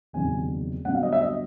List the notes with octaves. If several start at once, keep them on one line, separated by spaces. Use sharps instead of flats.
F#1 E2 C3 D#3 G#5
G2 D3 F#3 B3 F#5
F5
D#5
E5
D#5